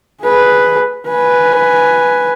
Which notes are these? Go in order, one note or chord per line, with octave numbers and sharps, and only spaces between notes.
G#4 B4
B4 G#5